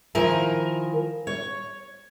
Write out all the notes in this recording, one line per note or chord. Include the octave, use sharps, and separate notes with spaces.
D#3 F3 E4 A#4 G#5
C#5